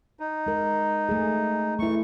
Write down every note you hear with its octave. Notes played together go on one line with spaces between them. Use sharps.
D#4
G#3 A#4
A3 G#4
E3 A3 E4 C#6